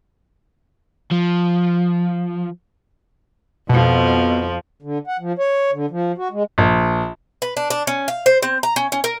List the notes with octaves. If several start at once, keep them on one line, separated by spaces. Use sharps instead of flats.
F3
F2 B2 F3
D3
F#5
F3
C#5
D3
F3
F#4
G#3
A#1
B4
D4
D4
C#4
F5
C5
C4
A#5
C#4
C#4
A#4